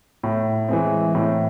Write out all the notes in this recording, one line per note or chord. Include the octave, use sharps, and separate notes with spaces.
A2
E3 G#3 C4
A2